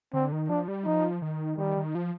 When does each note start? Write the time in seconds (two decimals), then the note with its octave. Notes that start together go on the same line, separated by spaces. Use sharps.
0.14 D3 C4
0.32 D#3
0.49 F3 D4
0.68 G3
0.85 F3 D#4
1.22 D#3
1.58 D#3 G3
1.77 D#3
1.95 F3